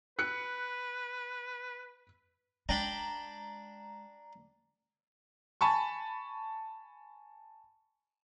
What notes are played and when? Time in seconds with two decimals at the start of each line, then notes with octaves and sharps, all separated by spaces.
0.19 B4 F#6 C#7
2.69 G#3 D4 G5 A#5 B5
5.61 G#5 A5 B5 C#6